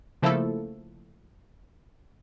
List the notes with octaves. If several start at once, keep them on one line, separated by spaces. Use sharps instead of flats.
C#3 F3 A3 A#3 E4 A4